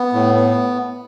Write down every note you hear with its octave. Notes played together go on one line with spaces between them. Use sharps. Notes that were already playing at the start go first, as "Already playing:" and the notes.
Already playing: B3
A2
B3